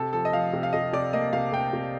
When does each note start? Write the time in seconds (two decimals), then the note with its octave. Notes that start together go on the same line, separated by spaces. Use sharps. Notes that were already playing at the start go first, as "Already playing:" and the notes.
Already playing: C3 A4
0.13 F3 A4
0.25 D#5
0.33 F3 F5
0.53 C3
0.63 F5
0.73 C3 D#5
0.93 C3 D5
1.13 A#3 D#5
1.33 C3 F5
1.53 C3 G5
1.73 C3